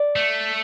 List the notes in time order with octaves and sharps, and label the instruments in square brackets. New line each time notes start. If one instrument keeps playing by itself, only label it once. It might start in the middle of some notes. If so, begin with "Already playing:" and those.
Already playing: [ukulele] D5
[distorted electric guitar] A3